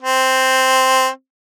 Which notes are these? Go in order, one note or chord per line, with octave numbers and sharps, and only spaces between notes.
C4